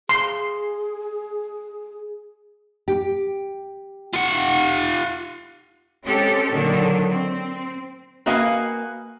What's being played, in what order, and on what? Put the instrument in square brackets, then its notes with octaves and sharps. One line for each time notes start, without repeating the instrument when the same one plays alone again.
[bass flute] G#4 [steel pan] C6
[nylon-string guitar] G4
[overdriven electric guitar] F4 F#5
[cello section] G#3 C4 C#4 G4 A4
A#2 D3 D#3 F#3
C4
[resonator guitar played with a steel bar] A#3 F#4 B4 D#5 F5 G#5